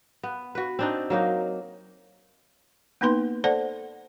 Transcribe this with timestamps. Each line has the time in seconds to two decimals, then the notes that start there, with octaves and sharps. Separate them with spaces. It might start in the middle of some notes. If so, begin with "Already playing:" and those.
0.23 B3
0.55 F#4 B4
0.79 C4 D4 D#4
1.10 F#3 A#3 D#4
3.01 A#3 B3 D#4 B4 C6
3.44 A4 C5 D5 F#5 A5